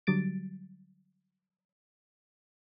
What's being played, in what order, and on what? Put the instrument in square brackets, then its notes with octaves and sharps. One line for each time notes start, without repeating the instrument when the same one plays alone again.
[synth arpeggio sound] D3 F#3 G3 A6 D7